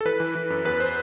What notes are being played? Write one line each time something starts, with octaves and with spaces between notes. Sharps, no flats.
A4
E3 B4
E3
E3
F#2
E2 B4
C5